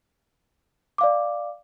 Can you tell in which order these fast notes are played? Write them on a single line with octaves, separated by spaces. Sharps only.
D6 F5 D5